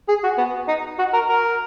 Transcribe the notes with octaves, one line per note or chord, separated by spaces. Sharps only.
G#4
F#4
B3
D#4
F#4
A#4
A#4